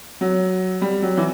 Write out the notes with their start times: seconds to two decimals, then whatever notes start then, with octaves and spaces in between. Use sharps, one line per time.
0.21 F#3
0.82 G3
1.02 F#3
1.17 E3